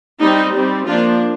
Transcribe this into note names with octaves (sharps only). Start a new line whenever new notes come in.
G3 C4 D#4
G3 C4
F3 A#3 D4 F4